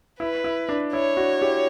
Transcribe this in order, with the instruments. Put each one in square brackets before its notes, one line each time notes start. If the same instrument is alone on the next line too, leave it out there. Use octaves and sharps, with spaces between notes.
[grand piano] E4 [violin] B4
[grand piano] E4
D4
[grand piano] E4 [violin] C#5
[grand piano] D4 F#4
E4 G4